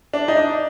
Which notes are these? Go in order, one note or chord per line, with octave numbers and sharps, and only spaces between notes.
D4
D#4
D4